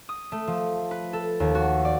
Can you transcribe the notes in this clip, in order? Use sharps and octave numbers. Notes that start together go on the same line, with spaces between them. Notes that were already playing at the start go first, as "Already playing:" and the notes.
D#6
A3
F3
B4
A4
D#2
F#4
D5